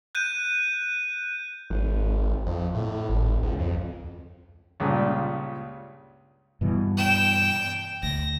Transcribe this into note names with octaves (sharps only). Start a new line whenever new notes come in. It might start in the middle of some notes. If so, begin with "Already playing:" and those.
F#6 G6 D#7
G#1
F2
A2
G#1
C#2
F2
C#2 G2 A#2 C#3
G2 B2 E3
G5 E7
D2 A#6